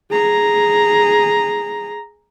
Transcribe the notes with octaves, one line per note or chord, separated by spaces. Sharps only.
G#4 A#5